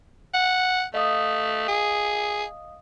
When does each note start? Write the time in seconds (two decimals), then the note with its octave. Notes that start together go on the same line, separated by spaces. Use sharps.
0.34 F#5
0.94 A3 D#5 F5 D#6
1.68 G#4